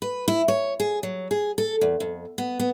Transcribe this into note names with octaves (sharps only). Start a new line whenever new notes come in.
B4
E4
C#5
G#4
F#3
G#4
A4
E2
F2
B3
B3